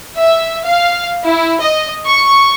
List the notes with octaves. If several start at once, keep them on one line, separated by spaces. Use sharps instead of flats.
E5
F5
E4
D#5
C#6